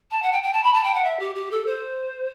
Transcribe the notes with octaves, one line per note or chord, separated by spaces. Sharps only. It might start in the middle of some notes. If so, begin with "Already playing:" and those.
A5
F#5
G5
G5
A5
B5
A5
G5
F#5
E5
G4
G4
A4
C5